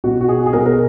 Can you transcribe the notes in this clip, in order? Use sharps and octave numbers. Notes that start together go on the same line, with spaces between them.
B2 F#4
F#4
G#4
G#4
B2 A#4
A#4